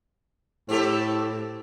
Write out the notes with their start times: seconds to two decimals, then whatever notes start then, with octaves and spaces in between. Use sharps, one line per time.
0.69 A2 C4 G4 A4